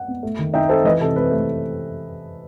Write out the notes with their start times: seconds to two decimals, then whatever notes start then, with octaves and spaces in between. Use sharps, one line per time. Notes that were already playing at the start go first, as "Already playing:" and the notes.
Already playing: F#5
0.08 B3
0.23 A3
0.39 D#3
0.53 D#4 E5 G5
0.69 C4 A4 C5
0.85 E3 B4 D#5
1.00 C3 A4
1.16 C4 B4
1.31 A3